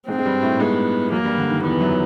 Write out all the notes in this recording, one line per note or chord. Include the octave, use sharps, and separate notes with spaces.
G#2 G#3 C4
G#3
G2 G3
A2 A3
G#2 G#3 B3
F#2 F#3 A#3
G2 G3
D3
D#3
E2 E3 B3
F#2 F#3